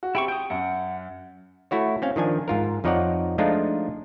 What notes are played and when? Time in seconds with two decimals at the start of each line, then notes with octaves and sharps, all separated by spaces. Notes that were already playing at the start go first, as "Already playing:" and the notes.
0.03 F#4
0.15 C4 E4 G4 G5 C#6
0.28 G5 D#6 G6
0.50 F#2 F#5
1.71 A3 E4 F#4 C#5
2.02 C4 C#4 F5
2.16 D#3 F3 D4 G#5
2.48 G#2 F4 A#4
2.84 F2 F3 D#4 C#5 D5 F#5
3.38 F3 G#3 A3 D4 D#4 F4